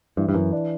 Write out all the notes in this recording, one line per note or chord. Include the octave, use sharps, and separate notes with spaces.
G2 E3
G2
F#2 E3
D4